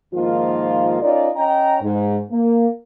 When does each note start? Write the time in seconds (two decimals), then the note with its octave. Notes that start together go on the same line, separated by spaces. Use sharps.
0.14 G#2 D#3 F3 A#3 F4
1.02 C#4 D#4 F4 A#4 D5
1.37 C#4 D#5 G5 A#5
1.82 G#2
2.31 A#3